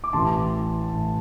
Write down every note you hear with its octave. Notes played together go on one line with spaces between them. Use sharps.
D6
A1 A2 E3 A5 C6
A2 E3